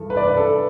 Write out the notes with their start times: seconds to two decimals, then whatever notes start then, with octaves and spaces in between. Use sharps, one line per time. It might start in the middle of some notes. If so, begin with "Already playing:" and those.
Already playing: G2 E3 A4
0.10 B4
0.17 D5
0.24 B4
0.37 A4